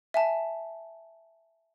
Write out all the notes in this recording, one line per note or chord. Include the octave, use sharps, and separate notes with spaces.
E5 G#5 A5